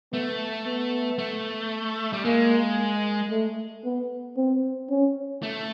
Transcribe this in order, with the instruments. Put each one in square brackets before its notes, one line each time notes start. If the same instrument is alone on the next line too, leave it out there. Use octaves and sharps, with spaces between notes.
[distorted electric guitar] A3 [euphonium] B3
[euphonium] B3
[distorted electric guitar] A3
G3
[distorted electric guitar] G#3 [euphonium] A#3
[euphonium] A3
B3
C4
C#4
[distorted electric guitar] A3